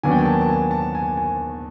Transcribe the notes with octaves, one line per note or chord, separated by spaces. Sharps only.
D#2 D#3 F#3 B3 D4 G#5
G5
G#5
A5
A5
G#5
A5
G#5
G#5